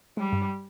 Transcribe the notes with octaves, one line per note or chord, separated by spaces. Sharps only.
G3 G#3
G2